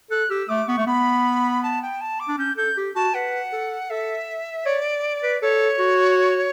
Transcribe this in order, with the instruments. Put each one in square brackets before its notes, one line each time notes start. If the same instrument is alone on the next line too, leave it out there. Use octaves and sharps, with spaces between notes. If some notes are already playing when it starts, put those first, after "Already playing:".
[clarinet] A4 [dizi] F#6
[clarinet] G4 [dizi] E6
[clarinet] A3 [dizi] D6
[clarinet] B3 [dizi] C#6
[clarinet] A3
[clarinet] B3 [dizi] B5
[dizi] A5
G5
A5
D6
[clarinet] D4
[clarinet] C#4 [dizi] G6
[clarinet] A4 [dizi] G6
[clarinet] G4
[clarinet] F#4 [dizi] A5
[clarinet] B4 [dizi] F#5
[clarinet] A4
[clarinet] A4 [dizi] E5
[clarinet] C#5 [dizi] D5
[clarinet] B4
[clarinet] A4 [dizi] C#5
[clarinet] F#4